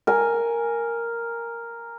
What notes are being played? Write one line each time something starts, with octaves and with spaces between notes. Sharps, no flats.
A#4 G#5